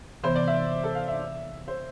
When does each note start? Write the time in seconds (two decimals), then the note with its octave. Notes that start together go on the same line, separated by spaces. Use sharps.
0.24 C3 E3 B3 C5
0.35 D5
0.48 E5
0.84 A4
0.95 F5
1.08 E5
1.68 C5